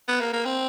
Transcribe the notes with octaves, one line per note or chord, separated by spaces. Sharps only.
B3
A#3
A#3
C4